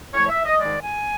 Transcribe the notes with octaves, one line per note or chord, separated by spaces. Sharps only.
A2 F3 A3 C#5
E5
D#5
G#2 D#3 G#3 D5
G#5